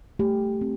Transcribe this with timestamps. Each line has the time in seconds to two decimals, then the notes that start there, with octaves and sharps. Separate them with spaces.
0.19 A3 G4
0.61 C4